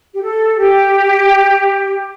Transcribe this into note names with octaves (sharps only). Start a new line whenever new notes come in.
G4
A4
G4